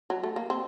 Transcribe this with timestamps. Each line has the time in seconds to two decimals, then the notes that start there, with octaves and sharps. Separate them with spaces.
0.10 F#3
0.23 A3
0.36 A#3
0.50 C4